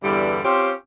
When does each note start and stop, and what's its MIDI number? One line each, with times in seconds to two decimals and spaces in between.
0.03 0.39 40
0.03 0.39 43
0.03 0.39 50
0.03 0.39 52
0.03 0.39 55
0.44 0.71 60
0.44 0.71 61
0.44 0.71 65
0.44 0.71 67